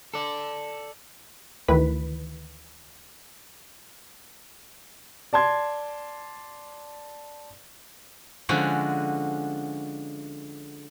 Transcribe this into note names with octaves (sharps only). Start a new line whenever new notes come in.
A4 D5
D2 D#3 E3 E4 B4 B6
D5 A5 C6 G#6
D3 F3 G#3 C#4 F#4